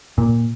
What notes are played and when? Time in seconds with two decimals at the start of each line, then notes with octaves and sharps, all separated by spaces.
0.18 A#2